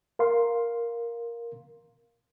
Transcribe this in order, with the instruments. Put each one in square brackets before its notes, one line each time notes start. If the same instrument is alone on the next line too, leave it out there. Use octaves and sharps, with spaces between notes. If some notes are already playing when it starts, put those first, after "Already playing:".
[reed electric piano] A#4 F5 C6